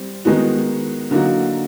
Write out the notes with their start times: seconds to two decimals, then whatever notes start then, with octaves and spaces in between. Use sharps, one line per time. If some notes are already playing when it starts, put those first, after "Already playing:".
Already playing: G3 C4
0.25 D#3 G#3 B3 D#4 F#4
1.11 D3 F#3 A#3 D#4 F#4